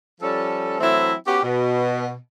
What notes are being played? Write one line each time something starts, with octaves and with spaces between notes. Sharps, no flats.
F3 G3 C#4 A4
E3 F#3 A3 C4 E4
B3 C#4 F#4 G4
B2